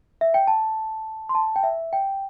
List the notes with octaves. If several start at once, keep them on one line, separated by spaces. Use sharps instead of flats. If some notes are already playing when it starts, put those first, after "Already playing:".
E5
G5
A5
C6
A5
G5
E5
G5